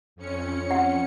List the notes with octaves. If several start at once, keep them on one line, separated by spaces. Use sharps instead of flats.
F2 C#4 C#7
F#5